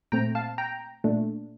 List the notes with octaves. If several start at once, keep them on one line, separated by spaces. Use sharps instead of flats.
A#2 A3 C4 G5 A#5
F5 A5
G5 A#5
A#2 A3 D4